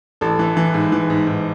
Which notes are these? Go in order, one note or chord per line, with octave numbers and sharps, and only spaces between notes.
A1 A4
E3
E3
G#2
E3
G#2
G#2